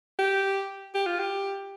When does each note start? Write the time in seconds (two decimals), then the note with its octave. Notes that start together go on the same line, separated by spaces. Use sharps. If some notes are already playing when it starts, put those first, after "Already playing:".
0.19 G4
0.95 G4
1.07 F4
1.20 G4